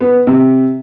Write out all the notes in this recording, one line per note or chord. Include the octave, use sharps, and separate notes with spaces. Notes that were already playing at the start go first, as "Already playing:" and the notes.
B3
C3